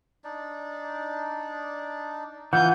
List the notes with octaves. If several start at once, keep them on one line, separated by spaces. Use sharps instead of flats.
D4 D#4 D5
E3 F4 F#5 G#5 G6